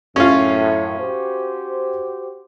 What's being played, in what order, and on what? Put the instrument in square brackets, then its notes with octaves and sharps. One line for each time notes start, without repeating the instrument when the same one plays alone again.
[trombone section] F#2 A2 [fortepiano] C#4 F4
[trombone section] F#4 G4 C5